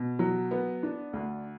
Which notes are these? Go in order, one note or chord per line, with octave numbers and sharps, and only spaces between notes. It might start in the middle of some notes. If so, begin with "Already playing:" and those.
Already playing: B2
F#3
B3
D4
D2